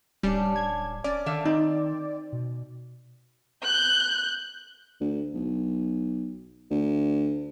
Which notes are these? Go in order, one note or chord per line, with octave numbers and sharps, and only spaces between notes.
D1 G3 C#4 D4
G#6
C#4 D5
D3 D#3 E5 F5
C4 D#4
B2
F#6 G6
D2
B1
D2